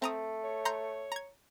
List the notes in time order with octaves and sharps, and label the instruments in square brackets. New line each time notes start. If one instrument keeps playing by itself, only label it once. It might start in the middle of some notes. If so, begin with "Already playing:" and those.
[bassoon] A3 [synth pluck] C4 A#5 D#6
[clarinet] C#5
[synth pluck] A#5 C6 G6
A#5 G#6